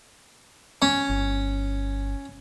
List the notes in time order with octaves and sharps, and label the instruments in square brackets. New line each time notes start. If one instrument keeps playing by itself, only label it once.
[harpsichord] C#4
[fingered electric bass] G1